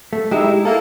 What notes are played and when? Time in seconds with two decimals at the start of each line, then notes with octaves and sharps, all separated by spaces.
0.13 A3
0.31 G#3 D#4 E4 G4
0.65 A#3 E4 A4